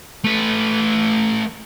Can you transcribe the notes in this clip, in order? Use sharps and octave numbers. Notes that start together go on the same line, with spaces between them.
A3 B4